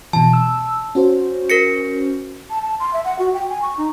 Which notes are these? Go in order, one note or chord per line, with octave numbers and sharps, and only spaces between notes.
B2 E3 A5
E6
C#4 F#4 C5
A#4 A#6 C#7
A5
A5
C6
E5
F#5
F#4
G5
G#5
C#6
D#4